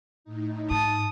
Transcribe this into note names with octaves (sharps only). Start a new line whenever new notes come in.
A2 D#4
G#2 A5 D#6